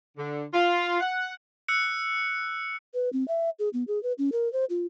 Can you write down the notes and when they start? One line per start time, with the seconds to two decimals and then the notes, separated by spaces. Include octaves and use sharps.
0.18 D3
0.53 F4
1.00 F#5
1.68 E6 F#6 C#7
2.94 B4
3.13 C4
3.28 E5
3.59 G#4
3.73 B3
3.88 G#4
4.03 B4
4.18 C#4
4.32 A#4
4.53 C5
4.70 F4